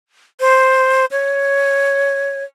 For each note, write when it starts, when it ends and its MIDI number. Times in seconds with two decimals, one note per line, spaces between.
0.40 1.05 72
1.11 2.44 73